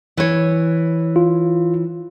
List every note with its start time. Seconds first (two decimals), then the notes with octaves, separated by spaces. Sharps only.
0.17 E3 C#5
1.16 F4